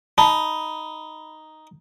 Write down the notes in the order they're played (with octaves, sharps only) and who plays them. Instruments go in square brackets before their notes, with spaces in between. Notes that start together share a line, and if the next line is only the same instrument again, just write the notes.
[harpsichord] D#4 [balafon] A5 [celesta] B5